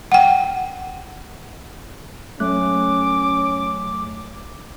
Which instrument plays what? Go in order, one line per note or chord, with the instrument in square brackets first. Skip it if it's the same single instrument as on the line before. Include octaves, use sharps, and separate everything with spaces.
[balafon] F#5 G5
[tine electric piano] F#3 A3 F#6 [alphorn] C#4 [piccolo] D6